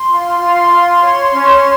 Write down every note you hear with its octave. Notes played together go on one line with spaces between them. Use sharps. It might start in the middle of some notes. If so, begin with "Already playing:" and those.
Already playing: C6
F4
F4
F4
C#5
C#4